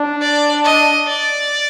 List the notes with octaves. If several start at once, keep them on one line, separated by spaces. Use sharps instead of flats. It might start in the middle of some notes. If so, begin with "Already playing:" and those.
Already playing: D4
D5
D#5
D5